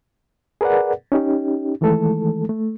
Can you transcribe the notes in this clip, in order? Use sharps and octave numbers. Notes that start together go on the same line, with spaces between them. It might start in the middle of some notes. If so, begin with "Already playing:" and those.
G#4 A#4 B4 D5 F#5
C#4 D#4 G4
D#3 E3 G#3 A3 A4
A3